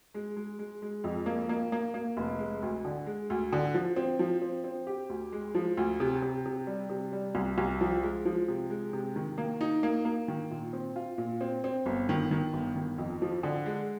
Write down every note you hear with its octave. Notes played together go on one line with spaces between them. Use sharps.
G#3
G#3
G#3
G#3
F2
A#3
A#3
A#3
A#3
F1
G#3
D2
D3
G#3
D2
D3
F3
C4
F3
C4
C4
G4
D2
G#3
F3
D2
C3
C3
C3
G3
C3
G3
C2
C2
F3
G#3
F3
C3
G#3
C3
D#3
A#3
D#4
A#3
A#3
D#3
A#2
C4
F4
A#2
C4
C4
G1
D#3
D#3
G1
D#3
F2
F3
D3
G#3